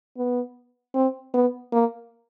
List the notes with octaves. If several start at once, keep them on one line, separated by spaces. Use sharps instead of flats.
B3
C4
B3
A#3